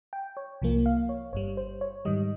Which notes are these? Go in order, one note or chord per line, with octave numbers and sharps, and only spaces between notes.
G5
C#5
C2 C3 F3 A#3 F4
F5
C#5
G1 G2 G3 C#5
C5
C#5
G#2 D#3 G3 D#5